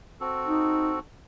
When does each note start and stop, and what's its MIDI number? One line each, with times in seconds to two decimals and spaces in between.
0.21 0.99 60
0.21 0.99 66
0.21 0.99 69
0.46 0.96 63